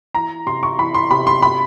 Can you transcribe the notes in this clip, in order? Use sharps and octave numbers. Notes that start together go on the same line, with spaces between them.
E3 A#5
C3 C6
C#6
E3 B5
C6
C3 B5
C6
B5